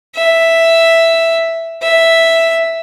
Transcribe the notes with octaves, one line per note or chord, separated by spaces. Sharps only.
E5
E5